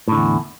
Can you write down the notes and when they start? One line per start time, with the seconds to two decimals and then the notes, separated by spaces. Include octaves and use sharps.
0.08 A2
0.12 D3
0.16 E2